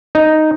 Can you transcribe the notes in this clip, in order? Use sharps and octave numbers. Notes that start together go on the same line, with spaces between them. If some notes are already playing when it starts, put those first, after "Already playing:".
D#4